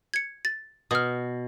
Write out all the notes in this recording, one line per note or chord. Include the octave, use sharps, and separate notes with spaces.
G#6 C#7
A6
B2 D#6 F6